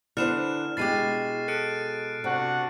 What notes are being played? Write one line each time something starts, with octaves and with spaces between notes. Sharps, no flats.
D3 B3 D4 E4 C5 F6 E7
B2 G#3 G4 A6 C7 D#7
A4 F#6 C#7 D7
C3 D4 F#4 F#5